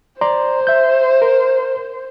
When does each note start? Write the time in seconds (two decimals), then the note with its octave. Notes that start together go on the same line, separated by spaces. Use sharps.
0.21 C5 D5 A#5 C6
0.67 E5 G6
1.22 A#4